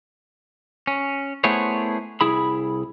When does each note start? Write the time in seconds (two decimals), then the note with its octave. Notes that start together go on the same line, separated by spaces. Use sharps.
0.87 C#4
1.44 A3 B3 E4 G#4 C5 C#5
2.21 C2 E4 G#4 B5